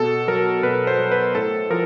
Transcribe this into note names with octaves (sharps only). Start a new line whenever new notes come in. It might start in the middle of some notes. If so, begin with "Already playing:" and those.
Already playing: B2 A4
F#3 A#4
B2 B4
C5
F#3
B4
A2 A4
F3 A#4